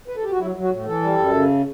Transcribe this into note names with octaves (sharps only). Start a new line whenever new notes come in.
B4
A4
G4
F#4
F#3 E4
F#3
F#4
A2
E3 A4
G3
F#2
C#3